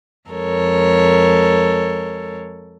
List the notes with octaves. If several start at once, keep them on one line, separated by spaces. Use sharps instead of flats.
F2 G#3 A4 A#4 C#5